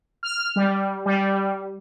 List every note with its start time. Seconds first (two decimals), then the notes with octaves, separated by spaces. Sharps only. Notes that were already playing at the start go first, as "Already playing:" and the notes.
0.23 F6
0.56 G3
1.06 G3